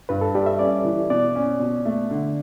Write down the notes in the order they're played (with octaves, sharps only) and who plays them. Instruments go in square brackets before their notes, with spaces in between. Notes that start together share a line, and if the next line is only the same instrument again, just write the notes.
[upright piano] G2 [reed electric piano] B4
[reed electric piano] A4
[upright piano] G3 [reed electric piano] G4
[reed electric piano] E5
[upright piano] C#4 [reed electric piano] D5
[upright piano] E3
[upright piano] B2 [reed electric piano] D5
[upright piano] C#4
B2
A3
D3